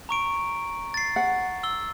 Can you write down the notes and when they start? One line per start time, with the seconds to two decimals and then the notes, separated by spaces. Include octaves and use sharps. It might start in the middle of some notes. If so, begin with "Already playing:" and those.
0.09 A#5 C#6 D7
0.94 A6 C7
1.16 F#5
1.63 E6 G7